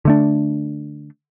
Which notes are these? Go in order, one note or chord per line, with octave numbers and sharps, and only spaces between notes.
D3 A3 D4